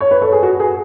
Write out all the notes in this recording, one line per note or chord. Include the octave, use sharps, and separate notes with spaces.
C#5
B4
A4
G#4
F#4
G#4